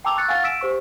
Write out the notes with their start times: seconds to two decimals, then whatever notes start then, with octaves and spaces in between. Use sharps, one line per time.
0.05 G5 A5 A#5 D6 E6 F7
0.17 C#6 E6 F#6 A6 C#7
0.28 F5 F#5 G#5 C#6 F6 A6
0.44 E6 B6 D7 E7
0.61 G4 C5 C#6